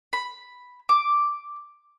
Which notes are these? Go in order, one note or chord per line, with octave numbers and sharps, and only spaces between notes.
B5
D6